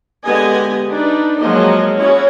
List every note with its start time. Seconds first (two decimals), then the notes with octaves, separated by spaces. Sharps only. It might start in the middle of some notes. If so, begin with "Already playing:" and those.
0.24 D3 G#3 B3 G4 D#5 G#5
0.89 D4 D#4 B4
1.40 F3 F#3 G#3 A#3 D#5
1.98 C#4 E4 F#4 G#4 C#5